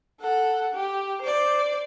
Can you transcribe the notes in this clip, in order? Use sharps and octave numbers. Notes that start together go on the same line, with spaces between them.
A4 F#5
G4
C5 D5